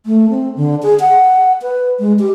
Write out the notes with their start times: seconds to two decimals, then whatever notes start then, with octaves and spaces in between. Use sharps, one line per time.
0.06 A3
0.30 C4
0.56 D3
0.83 G#4
1.00 F#5
1.62 B4
2.00 G#3
2.19 G4